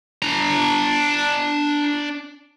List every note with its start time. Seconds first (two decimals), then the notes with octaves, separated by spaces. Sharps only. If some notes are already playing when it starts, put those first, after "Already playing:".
0.23 D4 A#5